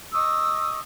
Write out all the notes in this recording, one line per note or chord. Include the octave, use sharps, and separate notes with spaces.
D#5 C#6 D#6 E6